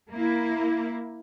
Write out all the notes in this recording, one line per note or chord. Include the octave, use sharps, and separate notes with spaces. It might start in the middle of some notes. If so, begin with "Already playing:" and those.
A#3 E4